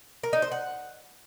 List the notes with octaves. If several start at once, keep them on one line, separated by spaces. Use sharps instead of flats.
A#4
D#4
C5
F#5